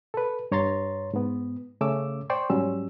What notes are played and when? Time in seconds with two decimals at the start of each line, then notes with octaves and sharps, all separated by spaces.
0.14 A4 B4
0.51 G2 C#5 A#5 C6 A6
1.14 G#2 B3
1.81 C#3 A3 C#4 D6 E6
2.30 C5 D5 G5 C6 C#6
2.50 G#2 F#3 G3 C#4 E6